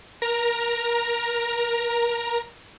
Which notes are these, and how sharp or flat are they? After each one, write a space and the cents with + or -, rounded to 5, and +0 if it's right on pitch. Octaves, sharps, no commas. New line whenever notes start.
A#4 +25 A#5 +0